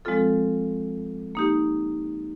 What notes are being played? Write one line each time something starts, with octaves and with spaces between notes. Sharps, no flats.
F3 G#3 C4 F4 A4
A#3 D#4 G4